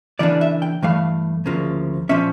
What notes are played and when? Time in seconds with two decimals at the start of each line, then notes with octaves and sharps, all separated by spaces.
0.19 C#3 E3 A#3 D4 D5
0.41 E5
0.62 G5
0.82 G2 E3 A3 F5
1.46 D2 C#3 F3 A#3
2.09 A#2 F3 C#4 E5